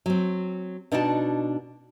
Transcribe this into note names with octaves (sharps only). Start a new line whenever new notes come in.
F#3 C4
B2 D4 D#4 F#4 A5